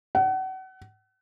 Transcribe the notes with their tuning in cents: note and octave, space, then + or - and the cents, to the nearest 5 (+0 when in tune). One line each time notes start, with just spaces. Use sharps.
F#5 +35